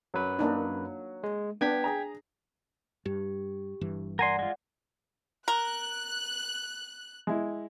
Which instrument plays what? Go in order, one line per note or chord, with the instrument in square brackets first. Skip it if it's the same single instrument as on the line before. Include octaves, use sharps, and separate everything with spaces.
[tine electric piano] F#2 B4 [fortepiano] F#3
[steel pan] A#3 D4 D#4
[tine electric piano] G#3
[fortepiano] B3 [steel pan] D4 [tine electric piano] G5 G#6 B6
[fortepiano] G#4 A#5
[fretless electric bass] G2 [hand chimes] G4
[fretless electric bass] G1 G2 E3
[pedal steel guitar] A#4 G#5 C6 [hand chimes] D5 F#5
[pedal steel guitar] G#3 F4
[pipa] A#4 [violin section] F#6
[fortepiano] G#3 E4